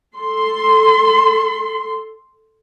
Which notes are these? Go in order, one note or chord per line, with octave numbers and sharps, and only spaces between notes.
A4 C6